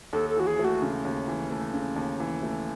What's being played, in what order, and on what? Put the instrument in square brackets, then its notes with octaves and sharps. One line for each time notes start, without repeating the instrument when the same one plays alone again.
[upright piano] D#2 [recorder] A4
[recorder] A4
[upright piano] E3 [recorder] F#4
[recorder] G#4
[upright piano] A3
[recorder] F#4
[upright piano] C#3
D#2
E3
A3
C#3
D#2
E3
A3